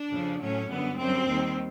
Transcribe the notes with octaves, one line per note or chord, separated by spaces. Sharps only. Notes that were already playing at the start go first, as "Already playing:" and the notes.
Already playing: D4
F2 C#3 F3
A2 F#3 A3 C#4
F#2 D3 G3 B3
F#2 D3 G3 C4
D#2 D#3 G3